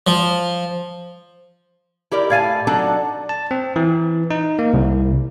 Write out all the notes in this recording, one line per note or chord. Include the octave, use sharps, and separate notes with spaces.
F3
E4 G4 A#4 D5
A2 F5 G#5 A5
F#3 D4 D#4 A4 D5 A5
A5
C4
E3
D#4
A#3
C2